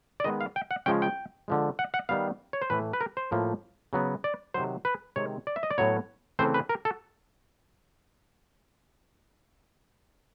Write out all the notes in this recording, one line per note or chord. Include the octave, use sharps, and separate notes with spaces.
D5
D#3 G#3 B3 D#5
F5
G5
F#5
C#3 F3 G#3 C#4 G5
G5
D3 F3 G#3
F#5
F#5
D#3 G3 B3 F5
C#5
C5
A2 E3 A3 B4
B4
A#4
C5
A2 F3 A#3
C#3 F#3 B3
D5
C3 D#3 F#3 C5
B4
C3 D#3 G#3 C4 C#5
D5
E5
D#5
D5
A2 F#3 B3 C#5
C#3 E3 A3 C4 C5
B4
A#4
A4